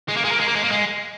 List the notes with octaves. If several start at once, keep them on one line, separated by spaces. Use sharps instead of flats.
G#3
A#3
G#3
A#3
G#3
A#3
G#3
A#3
G#3